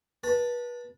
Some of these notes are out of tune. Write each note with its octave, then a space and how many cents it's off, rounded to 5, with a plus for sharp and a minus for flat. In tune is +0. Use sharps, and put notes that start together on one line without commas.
B4 -30 A5 +5